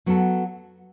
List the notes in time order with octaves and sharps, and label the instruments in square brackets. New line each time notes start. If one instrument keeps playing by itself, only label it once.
[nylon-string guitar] F#3 B3 F#4 A4